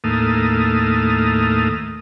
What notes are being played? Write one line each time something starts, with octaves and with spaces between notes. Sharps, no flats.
D#2 A2 A3 A#3 D#6 F6